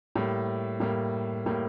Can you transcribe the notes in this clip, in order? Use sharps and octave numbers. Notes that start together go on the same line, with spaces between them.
A2 G3 A#3
A2 G3 A#3
A2 G3 A#3